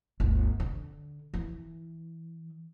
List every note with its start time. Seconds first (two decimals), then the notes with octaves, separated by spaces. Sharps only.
0.20 G1 D2
0.60 D3
1.34 E3